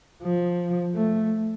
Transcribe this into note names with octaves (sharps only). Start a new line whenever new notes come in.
F3
A3